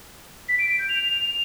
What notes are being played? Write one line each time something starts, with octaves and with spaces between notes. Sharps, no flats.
B6
D7
D7
G6
F7